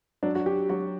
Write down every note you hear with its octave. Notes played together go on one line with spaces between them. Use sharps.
F#3 D4
F#4
G4
F#3 F#4